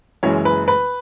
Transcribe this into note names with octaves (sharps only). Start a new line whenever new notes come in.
F#1 F#2 E3 G#3 C#5
B4
B4